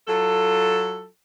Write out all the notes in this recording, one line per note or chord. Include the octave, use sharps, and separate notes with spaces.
F#3 F4 A4